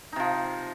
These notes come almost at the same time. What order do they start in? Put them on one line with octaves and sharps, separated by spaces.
D#4 C3 F3